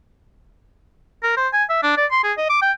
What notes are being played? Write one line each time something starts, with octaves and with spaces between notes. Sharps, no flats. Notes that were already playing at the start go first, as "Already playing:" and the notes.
A#4
C5
G#5
E5
D4
D5
C6
G#4
D#5
D6
G5